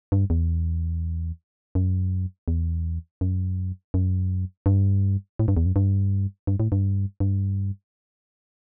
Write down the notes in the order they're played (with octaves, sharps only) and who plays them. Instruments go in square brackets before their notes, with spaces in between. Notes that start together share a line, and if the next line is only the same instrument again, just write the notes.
[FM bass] G2
E2
F#2
E2
F#2
F#2
G2
A2
G2
E2
F#2
G2
G2
A2
G2
G2